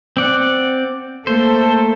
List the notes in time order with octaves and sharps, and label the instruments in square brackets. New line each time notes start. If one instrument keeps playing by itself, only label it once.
[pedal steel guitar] C4 D5 F#5
[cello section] A3 A#3 A4 [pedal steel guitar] C5